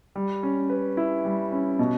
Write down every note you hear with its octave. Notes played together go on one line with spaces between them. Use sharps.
G3
C#4
B4
E4
G3
C#4
B2